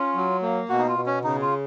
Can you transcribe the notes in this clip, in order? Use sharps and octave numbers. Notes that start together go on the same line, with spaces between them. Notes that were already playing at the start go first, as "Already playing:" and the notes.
Already playing: C#4 F4
F#3
A#3
B2 F#4
D#4
F4
B2
C#4
C#3 D#4
F4